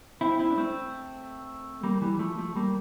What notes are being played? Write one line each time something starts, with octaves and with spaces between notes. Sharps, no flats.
C4 E4
C4 E4
D4
A3 C4
G3 A#3
E3 G3
F3 A3
F3 A3
G3 A#3